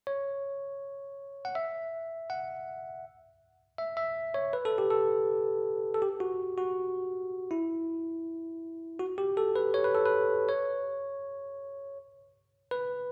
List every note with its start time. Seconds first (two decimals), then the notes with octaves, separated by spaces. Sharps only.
0.07 C#5
1.45 F#5
1.55 E5
2.30 F#5
3.78 E5
3.97 E5
4.34 C#5
4.53 B4
4.65 A4
4.78 G4
4.91 A4
5.94 A4
6.02 G4
6.20 F#4
6.58 F#4
7.51 E4
8.99 F#4
9.18 G4
9.37 A4
9.56 B4
9.74 C#5
9.84 B4
9.95 A4
10.06 B4
10.49 C#5
12.71 B4